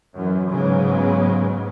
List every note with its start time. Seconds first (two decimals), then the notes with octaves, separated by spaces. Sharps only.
0.15 F#2 E3
0.50 G#2 C#3 F#3 G#3 B3